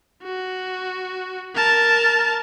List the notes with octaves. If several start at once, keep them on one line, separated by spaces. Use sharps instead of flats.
F#4
A#4 A5